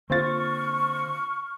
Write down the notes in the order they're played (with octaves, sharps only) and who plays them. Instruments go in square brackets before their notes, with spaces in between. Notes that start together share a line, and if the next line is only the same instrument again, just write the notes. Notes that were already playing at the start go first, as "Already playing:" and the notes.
[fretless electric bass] D3 A#3 [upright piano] C4 F4 A6 [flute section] C#6 F6